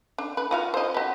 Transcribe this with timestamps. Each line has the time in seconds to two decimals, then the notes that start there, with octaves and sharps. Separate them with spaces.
0.18 D4
0.37 B4
0.51 F4 F#4 F5
0.74 C5 D#5
0.94 F#4 B4